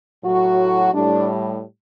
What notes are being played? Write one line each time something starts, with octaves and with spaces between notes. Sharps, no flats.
A2 F#3 F#4
A2 G3 D4